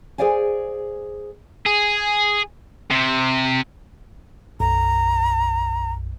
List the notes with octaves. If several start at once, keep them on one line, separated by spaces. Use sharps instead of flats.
G#4 C5 D5 F5 G#5
G#4
C3
B1 F#2 A#5